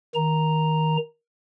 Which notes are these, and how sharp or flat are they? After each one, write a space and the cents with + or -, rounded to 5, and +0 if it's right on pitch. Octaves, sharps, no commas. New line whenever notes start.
D#3 +10 A#5 +0